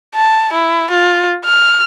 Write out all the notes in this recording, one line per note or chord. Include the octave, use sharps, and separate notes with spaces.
A5
E4
F4
F6